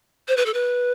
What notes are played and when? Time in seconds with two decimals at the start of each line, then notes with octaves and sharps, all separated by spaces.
0.28 C5
0.37 B4
0.46 A4
0.54 B4